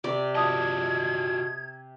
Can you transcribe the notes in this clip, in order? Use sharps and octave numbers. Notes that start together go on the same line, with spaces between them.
C3 D5
F4 F#4 D#5 A5 D#6 G#6